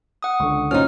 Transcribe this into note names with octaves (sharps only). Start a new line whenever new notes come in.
F#5 D#6
C#2 D3 C#6
F#2 C4 C#4 D#4 F4 F6